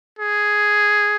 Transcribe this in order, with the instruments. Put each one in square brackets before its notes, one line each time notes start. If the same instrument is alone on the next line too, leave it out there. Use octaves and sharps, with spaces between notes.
[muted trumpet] G#4